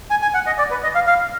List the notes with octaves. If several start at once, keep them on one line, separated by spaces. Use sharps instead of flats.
G#5
G#5
F#5
D#5
D5
B4
D#5
F5
F5